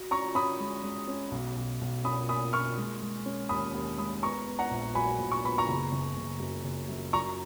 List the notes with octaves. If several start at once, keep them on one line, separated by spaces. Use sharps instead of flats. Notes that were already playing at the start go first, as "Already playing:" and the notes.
Already playing: F#4
C#4 A#5 C#6
C#4 B5 D#6
G#3
G#3
C#4
B1
B1
B1
C#4 B5 D#6
A#3 B5 D#6
A#3 C#6 F6
G#3
G#3
C#4
D#2 B5 D#6
D#2
G#3 B5 D#6
B3 A#5 C#6
B3
F#5 A#5
A#1
F#3 G#5 B5
A#1
C#6
B3 B5
A#5 C#6
F#1
F#1
F#1
F#2
F#1
F#2
F#3 A#5 C#6